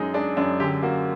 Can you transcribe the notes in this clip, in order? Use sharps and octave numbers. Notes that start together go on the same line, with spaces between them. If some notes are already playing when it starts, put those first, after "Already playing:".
Already playing: F#2 G#3 D#4
G#3 D4
F#2 D4
D3 G4
A#3 F#4